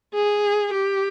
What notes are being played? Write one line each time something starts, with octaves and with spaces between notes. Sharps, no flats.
G#4
G4